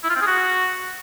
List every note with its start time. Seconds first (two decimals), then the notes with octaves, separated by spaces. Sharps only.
0.04 E4
0.10 F4
0.16 C4
0.21 G#4
0.27 F#4